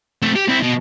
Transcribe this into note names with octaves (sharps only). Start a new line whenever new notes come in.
A3 C4
G4
C4 E4
B2